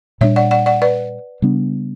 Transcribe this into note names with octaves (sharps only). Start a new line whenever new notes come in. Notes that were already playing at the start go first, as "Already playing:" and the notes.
A#2 G3 B3 D4 C#5 E5
D5 F#5
D5 F#5
D5 F#5
B4 D5
C#3 G3 B3 D4